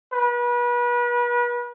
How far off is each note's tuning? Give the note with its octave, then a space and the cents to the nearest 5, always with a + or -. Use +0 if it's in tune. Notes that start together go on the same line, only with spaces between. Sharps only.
B4 -35